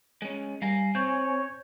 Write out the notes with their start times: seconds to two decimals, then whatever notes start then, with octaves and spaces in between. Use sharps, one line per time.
0.22 G#3 C#4
0.62 G3 F5 G#5 A#5
0.95 C4 C#5 G6